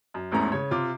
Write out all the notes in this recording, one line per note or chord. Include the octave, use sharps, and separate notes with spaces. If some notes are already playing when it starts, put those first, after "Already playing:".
F#2
A1 E2 G#2 A3 C#4 A#5
C#3 C#5
C3 F4 D6